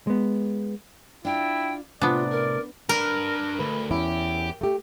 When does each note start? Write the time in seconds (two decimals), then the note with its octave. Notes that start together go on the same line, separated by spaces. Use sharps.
0.07 G#3 B3
1.25 D4 E4 F4 G5
2.02 A2 C3 B3 D4 F4 D5
2.30 A#4
2.89 D4 A#4 B4
3.59 D2 B4
3.91 E2 C#4 E4 G4
4.61 A3 G4